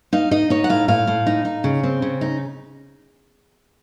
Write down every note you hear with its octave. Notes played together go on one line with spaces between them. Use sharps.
D#4 F5
D#4 D#5
D#4 C#5
F#5
A2 F5
A2 F5
A2
D#4
D#4
C#3
C4
C#3
D#4